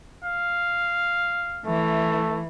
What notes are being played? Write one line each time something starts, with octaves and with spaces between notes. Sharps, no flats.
F5
E3 A3